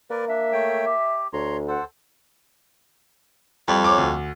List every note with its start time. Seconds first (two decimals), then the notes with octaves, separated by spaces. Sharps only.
0.10 A#3 A#4 B4 D5
0.29 D4 E5
0.52 A3 C#5 G5
0.86 G4
1.33 D2 C#5 A#5 C6
1.68 A4 C5 F#5
3.68 F2 G3
3.84 C#5 D6
3.98 D2